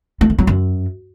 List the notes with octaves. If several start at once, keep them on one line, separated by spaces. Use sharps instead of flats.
A3
D#3
F#3
F#2